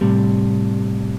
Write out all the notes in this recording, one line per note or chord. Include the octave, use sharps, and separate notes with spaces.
A2 C3 G3